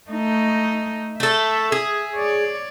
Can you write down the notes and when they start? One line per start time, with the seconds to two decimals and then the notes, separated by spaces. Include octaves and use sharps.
0.10 A3 D#4
1.20 A3 A4 E5
1.72 G#4
2.16 C#5 D5